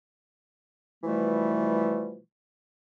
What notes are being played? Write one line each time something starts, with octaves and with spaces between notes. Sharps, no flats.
B2 E3 F3 G3 A3